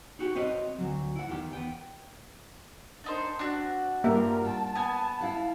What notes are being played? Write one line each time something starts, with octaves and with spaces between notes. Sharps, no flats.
D#4 F#4 G4
C4 F#4 B4 C#5 D#5
D2 E3 F#3
E4 F#5
E2 D#3 G4
B3 G5
C4 D4 D#4 C5
D4 F#4
G2 A#3 F4 G4 A#4 E5
G5 A5
B3 G#5
E4 F5 F#5